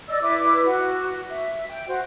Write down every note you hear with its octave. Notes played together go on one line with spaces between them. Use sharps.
D5 D#5 E6
E4 B4 D6
F#4
E5
G5
F#4 C5